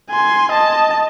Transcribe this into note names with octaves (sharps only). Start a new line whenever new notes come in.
G#5 C6
D#5 A5